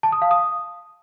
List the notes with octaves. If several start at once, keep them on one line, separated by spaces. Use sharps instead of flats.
A5
D#6
F5
D#6